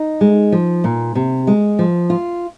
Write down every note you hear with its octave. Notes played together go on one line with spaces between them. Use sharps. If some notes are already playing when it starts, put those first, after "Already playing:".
Already playing: D#4
G#3
F3
A#2
C3
G#3
F3
F4